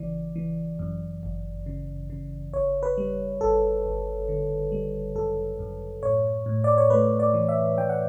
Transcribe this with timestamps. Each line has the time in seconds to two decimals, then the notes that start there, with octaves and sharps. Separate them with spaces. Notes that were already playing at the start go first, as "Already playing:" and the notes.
Already playing: G1 C#3 E3 D5
0.36 E3
0.79 F#2
1.23 G1
1.66 C#3
2.10 C#3
2.53 G1 C#5
2.83 B4
2.97 G3
3.41 G1 A4
3.85 G1
4.29 D3
4.72 G3
5.15 F#2 A4
5.59 F#2
6.03 A2 C#5
6.46 A2
6.64 D5
6.78 C#5
6.90 A3 B4
7.20 D5
7.34 E3
7.49 E5
7.78 E3 G5
7.89 F#5